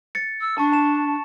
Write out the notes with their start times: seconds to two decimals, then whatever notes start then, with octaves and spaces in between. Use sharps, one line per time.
0.15 A6 C#7
0.40 E6
0.58 D4 A5 C#6
0.72 A5 E7